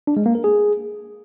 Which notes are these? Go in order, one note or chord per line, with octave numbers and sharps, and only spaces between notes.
D4
G#3
A#3
A#4
G#4